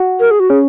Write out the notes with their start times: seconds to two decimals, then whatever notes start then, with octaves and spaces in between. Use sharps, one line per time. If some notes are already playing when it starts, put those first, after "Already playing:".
Already playing: F#4
0.20 A#4
0.31 G#4
0.40 F#4
0.50 C#4 G#4